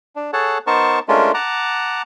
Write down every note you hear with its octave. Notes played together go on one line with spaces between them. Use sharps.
D4
G#4 A4 C#5 F#5 A5
B3 D#4 A#4 C5 A5 C#6
G#3 A3 C#4 D4 F4 A#4
F#5 A5 A#5 D6